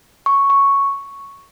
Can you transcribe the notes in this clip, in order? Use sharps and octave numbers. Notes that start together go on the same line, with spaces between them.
C#6
C#6